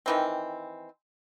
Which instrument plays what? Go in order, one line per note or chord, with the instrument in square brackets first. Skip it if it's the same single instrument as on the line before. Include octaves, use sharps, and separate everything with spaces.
[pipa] D#3 E3 C4